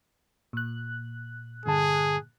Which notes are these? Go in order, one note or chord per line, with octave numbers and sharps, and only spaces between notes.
A#2 F#6
G2 D3 G#4 A5